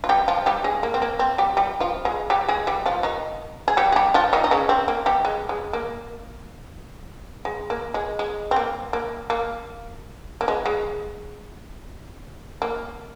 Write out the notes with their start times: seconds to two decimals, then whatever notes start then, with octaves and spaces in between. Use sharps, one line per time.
0.04 F4
0.09 G3 G4
0.28 F3 F4
0.46 G3 G4
0.64 G#3 G#4
0.83 A#3
0.94 C4
1.02 A#3
1.19 C4
1.38 G3 G4
1.57 G3 G4
1.80 F3 F4
2.05 G#3 G#4
2.30 G3 G4
2.48 G#3 G#4
2.67 G3 G4
2.86 F3 F4
3.03 D#3 D#4
3.68 G#4
3.77 G3 G4
3.92 G#4
3.96 G3 G4
4.14 F3 F4
4.33 D#3 D#4
4.44 D#4
4.51 C#3 C#4
4.69 C4
4.88 A#3
5.06 G3 G4
5.25 G#3
5.49 G#3
5.73 A#3
7.45 G#3
7.70 A#3
7.94 G#3
8.19 G#3
8.51 C4
8.56 A#3
8.93 A#3
9.30 A#3
10.41 A#3
10.48 G#3
10.66 G#3
12.62 A#3